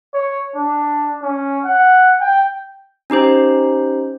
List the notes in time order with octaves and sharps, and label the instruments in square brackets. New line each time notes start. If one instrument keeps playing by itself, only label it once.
[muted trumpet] C#5
D4
C#4
F#5
G5
[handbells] C#4 D#4 G4 C5